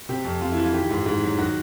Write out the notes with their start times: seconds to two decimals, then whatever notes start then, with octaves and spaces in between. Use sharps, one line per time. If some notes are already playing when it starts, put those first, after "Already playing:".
0.09 C3 G4
0.24 F2
0.41 F2 F4
0.52 E3 E4
0.63 F4
0.73 D#3 G4
0.91 G#2
1.06 G#2
1.23 F#3
1.38 D#3 F#4